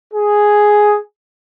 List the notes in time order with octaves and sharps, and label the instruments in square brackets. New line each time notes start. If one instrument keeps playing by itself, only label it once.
[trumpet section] G#4